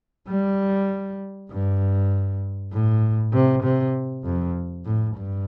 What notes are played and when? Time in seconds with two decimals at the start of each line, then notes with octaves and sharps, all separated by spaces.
0.28 G3
1.50 G2
2.72 A2
3.33 C3
3.63 C3
4.25 F2
4.85 A2
5.16 G2